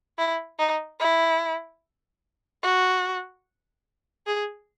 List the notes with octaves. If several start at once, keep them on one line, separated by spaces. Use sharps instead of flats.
E4
D#4
E4
F#4
G#4